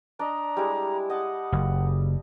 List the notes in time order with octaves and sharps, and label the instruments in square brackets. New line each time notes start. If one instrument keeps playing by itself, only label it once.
[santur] D4 D#5 [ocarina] A#5
[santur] G3 G#3 E4
[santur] D#5 A5 [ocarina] F#5
[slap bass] F#1